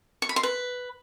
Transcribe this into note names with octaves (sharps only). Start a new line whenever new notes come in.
C#6
B5
C6
B4